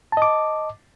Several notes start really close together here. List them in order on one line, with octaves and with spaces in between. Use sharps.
A5 D#5 D6